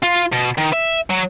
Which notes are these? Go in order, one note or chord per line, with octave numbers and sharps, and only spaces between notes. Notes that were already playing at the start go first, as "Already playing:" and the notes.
F4
B2
D#3
E5
F#3